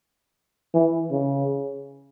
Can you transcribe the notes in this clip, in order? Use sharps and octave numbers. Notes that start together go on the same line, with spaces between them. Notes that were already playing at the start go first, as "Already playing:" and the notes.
E3
C#3